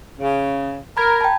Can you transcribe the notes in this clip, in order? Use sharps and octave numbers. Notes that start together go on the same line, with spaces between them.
C#3
A#4 A#5 B5 G#6
G5 A5